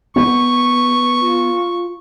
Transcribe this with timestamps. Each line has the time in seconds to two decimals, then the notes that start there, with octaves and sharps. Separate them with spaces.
0.16 B3 C#6
1.21 F4